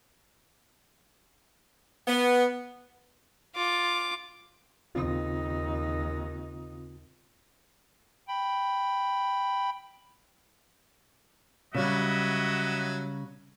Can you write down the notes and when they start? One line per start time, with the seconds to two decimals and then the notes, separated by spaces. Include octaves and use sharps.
2.08 B3
3.55 F4 D6
4.95 D#2 C#3 C4 D#4 F4
8.28 G5 B5
11.74 C#3 F#3 G3 D#5 E5 F#5